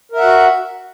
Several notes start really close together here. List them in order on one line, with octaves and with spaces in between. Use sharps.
A#4 E5 F#5 F#4